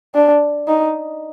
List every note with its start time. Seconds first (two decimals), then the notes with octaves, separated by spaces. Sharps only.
0.15 D4
0.68 D#4